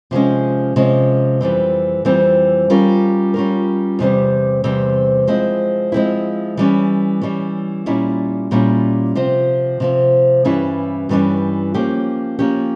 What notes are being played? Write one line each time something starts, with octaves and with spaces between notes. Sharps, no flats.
C3 F3 G#3 C#4
C3 F3 G#3 C#4
F2 E3 G3 C4
F2 E3 G3 C4
G3 C#4 F4 A#4
G3 C#4 F4 A#4
E2 C3 G3 C4
E2 C3 G3 C4
F3 G#3 C4 E4
F3 G#3 C4 E4
E3 G3 C#4
E3 G3 C#4
A#2 G3 C#4 E4
A#2 G3 C#4 E4
C3 F3 C4
C3 F3 C4
G2 E3 G3 C#4 E4
G2 E3 G3 C#4 E4
F3 A#3 C#4 G4
F3 A#3 C#4 G4